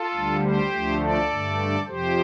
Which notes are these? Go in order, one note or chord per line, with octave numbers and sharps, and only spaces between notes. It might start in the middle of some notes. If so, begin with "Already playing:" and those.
Already playing: F4 A4
D2 D3 G3
G4 C5
D2 D3 F3 A3
A4 D5
G2 D3 A3
F2 C3 F3 G4 C5